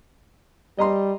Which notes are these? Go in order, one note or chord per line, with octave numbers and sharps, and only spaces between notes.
G3 D#5 A#5 C6